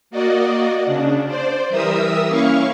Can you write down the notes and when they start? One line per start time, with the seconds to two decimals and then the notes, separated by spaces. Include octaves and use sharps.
0.10 A#3 F#4 D5 D#5
0.86 C#3 D4
1.27 C5 D5
1.69 E3 G3 A#4 E5 D#6 E6
2.27 A#3 C#4 E4 F5 C#6